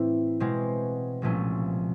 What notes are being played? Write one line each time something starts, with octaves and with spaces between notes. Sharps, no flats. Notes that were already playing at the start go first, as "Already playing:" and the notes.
Already playing: A2 E3 A3 C4 E4
B2 G#3 C4
C2 A#2 F3 A3 C#4